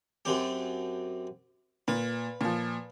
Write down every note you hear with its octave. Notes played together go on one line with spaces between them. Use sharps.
F#2 C4 G4
A#2 B4
A#2 F3